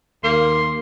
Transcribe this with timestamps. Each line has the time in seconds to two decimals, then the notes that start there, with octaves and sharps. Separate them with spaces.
0.24 D#2 A#3 C6